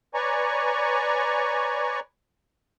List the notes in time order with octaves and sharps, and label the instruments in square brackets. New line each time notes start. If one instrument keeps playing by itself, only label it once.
[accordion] B4 C#5 D5 G#5 A#5 C#6